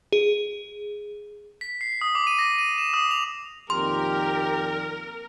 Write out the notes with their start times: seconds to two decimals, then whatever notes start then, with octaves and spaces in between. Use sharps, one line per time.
0.12 G#4
1.61 B6
1.81 C7
2.01 D#6
2.15 D6
2.27 D#7
2.39 A#6
2.58 D#7
2.78 E7
2.94 D#6
3.11 F7
3.70 F2 A#2 D#3 G4 A#4 C6